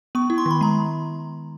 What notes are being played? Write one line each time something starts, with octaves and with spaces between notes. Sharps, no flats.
B3 C#6
E4
C6
D#3 B5
G#3 A#5